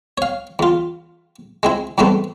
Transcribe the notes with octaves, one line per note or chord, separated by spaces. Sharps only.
C#5 F5
E2 F4
G#3 C4 E4
E2 G#2 G3 A3 B3 C4